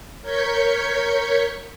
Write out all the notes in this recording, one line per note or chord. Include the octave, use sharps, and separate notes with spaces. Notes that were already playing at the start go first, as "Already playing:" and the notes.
A#4 C#5 G6 G#6 B6 C#7